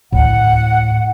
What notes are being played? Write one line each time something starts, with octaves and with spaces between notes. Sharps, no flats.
A1 D2 A2 F#5